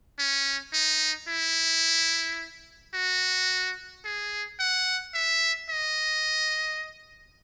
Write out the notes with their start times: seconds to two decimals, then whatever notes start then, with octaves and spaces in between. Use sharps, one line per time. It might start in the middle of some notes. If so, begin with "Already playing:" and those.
0.19 C#4
0.73 D#4
1.28 E4
2.94 F#4
4.05 G#4
4.60 F#5
5.14 E5
5.70 D#5